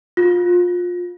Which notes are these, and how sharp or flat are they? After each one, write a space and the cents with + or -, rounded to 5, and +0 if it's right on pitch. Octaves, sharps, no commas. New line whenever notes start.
F4 +25